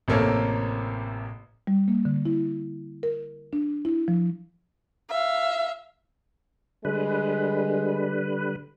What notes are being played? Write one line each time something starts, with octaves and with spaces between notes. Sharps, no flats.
A1 C3 A#3 A4 C#5
G3
A#3
D3
E4
A#4
D4
E4
F3
E5 F5
D3 G3 G#3 B4